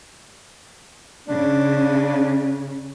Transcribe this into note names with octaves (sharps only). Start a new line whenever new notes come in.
C#3 D4